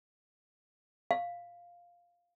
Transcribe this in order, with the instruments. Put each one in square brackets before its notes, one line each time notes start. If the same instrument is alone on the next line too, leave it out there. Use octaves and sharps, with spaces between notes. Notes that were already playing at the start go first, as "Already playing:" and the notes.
[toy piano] F5